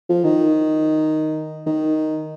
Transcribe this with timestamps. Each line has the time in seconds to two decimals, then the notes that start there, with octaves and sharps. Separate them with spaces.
0.09 F3
0.24 D#3
1.66 D#3